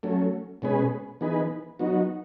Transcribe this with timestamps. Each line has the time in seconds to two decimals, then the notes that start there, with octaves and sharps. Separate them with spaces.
0.03 F#3 A3 C#4
0.62 B2 G#3 C#4 G#4 B4
1.21 E3 B3 D#4 G#4 B4
1.79 F#3 B3 D#4 F#4